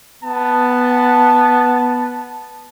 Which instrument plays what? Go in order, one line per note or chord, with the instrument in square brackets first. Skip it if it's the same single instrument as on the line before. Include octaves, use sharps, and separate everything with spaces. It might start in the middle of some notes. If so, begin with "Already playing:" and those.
[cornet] B3 [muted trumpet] A5